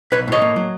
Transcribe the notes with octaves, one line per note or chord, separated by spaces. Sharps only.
B1 B4 C#5
A2 C#5 D#5
A#3
F#3